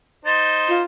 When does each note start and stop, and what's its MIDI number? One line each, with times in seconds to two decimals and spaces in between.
0.25 0.79 63
0.25 0.79 72
0.25 0.71 93
0.68 0.83 65